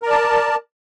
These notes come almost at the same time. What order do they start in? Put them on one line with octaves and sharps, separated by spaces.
A#4 D5 A5